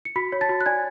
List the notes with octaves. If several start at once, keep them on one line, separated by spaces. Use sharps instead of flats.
C#7
F#4 B5 B6
C#5
A5 A6
F#4
F#6
D5 G#5 G#6